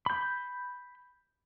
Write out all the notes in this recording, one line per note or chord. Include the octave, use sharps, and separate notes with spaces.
B5 G6